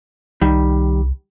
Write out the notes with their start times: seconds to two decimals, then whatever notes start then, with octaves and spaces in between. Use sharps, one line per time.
0.41 C2 D#3 G3